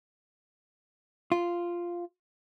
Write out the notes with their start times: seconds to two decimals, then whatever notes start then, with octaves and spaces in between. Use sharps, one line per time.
1.32 F4